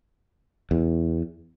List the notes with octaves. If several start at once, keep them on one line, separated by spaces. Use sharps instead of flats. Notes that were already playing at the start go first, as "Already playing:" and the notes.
E2